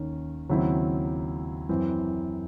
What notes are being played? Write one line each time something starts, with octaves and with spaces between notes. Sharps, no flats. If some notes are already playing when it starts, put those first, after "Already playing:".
Already playing: D#2 D#3 C#4
D#2 C#3 F#3 C4 E4
F#2 E3 C4